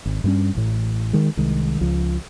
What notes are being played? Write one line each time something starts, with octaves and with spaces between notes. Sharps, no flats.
G#1
G2 G3 C#4
A1 A2
D#3 G#3
C2 D#3 G#3
C#2 F3